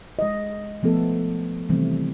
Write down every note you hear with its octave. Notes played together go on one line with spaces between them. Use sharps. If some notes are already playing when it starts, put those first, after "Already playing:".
G#3 D#5
F3 A3 B3 A4
C3 D#3 E3 G3 A3 C4